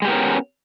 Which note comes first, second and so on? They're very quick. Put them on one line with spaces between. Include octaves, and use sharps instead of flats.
G#3 G4 B3 A#4 C#4